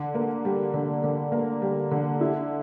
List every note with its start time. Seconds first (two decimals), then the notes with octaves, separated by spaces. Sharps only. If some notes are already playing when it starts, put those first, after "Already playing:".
Already playing: D3
0.15 A#3
0.45 G3
0.74 D3
1.04 D3
1.32 A#3
1.62 G3
1.91 D3
2.21 E4